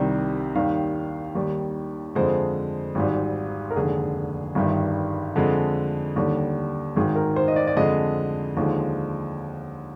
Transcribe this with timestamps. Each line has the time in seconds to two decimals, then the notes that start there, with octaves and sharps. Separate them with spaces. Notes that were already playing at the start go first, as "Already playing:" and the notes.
Already playing: C2 C3 D#3 G3
0.55 D#2 D#3 G3 F5
1.35 D#2 D#3 G3 D5
2.15 F2 D3 G#3 C5
2.95 G#1 G#2 G3
3.71 A#4
3.75 F1 D#2 D3 G#3 G#4
4.55 G1 G2 D#3 G3
5.36 F2 D3 G#3
6.16 D#2 D3 G3
6.96 G#1 G#2 D#3 G#4
7.15 A#4
7.36 C5
7.48 D#5
7.56 D5
7.67 D5
7.76 F2 D3 G#3 D#5
8.57 D#2 D3 F3 G#3